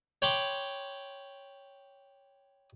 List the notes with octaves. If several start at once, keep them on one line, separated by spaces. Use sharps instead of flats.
C#5 G5 B5 C6 D6